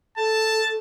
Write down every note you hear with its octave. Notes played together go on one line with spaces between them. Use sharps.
A4 A5